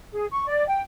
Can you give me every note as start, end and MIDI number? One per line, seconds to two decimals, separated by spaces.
0.12 0.26 68
0.31 0.45 85
0.48 0.66 74
0.67 0.81 79